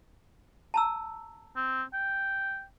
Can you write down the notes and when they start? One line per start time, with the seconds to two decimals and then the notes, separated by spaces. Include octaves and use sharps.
0.74 A5 A#5 E6
1.56 C4
1.93 G5